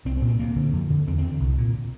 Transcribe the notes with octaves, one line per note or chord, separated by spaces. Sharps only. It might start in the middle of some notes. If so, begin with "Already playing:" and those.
C2 C4
C4
A#2
C4
D2 A#3
D3
F2
D3
E2 C4
C4
D3
C2
A#2